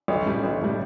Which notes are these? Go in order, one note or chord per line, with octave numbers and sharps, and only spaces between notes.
B1
A2 G3
B1
A2 G3